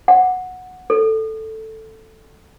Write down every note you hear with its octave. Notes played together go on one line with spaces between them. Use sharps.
F#5
A4